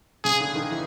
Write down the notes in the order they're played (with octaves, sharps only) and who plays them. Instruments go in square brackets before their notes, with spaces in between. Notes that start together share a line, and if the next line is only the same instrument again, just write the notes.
[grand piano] C#3 [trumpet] G#4
[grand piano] D3
D#3
E3